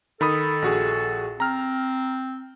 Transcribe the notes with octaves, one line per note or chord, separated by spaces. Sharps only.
D#3 A4 B5 D#6
A#1 F#4 G#4
C4 A#5 F6